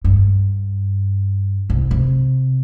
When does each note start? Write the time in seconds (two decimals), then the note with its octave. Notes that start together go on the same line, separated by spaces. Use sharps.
0.04 G2
1.70 C2
1.91 C3